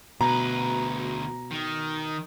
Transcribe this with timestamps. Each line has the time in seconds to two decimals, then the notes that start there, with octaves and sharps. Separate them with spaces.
0.21 D2 B2 B4 A#5
1.51 D#3